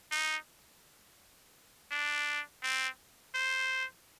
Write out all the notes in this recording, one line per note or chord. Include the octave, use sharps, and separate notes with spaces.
D#4
D4
C4
C5